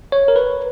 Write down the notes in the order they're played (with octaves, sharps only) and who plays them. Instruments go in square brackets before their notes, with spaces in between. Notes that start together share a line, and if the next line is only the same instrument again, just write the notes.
[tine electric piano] C#5
A#4
B4